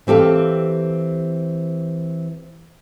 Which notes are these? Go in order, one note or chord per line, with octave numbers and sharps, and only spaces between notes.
E3 C4 G4 A4 F5